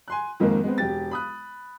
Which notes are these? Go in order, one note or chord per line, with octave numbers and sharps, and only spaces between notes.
G#5 C6 F#6
F2 G#2 D#3 G#3 A#3
G#3 B3 C4
E1 G4 A6
B5 D#6 F#6